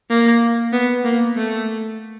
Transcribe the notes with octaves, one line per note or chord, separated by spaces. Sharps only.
A#3
B3
A#3
A3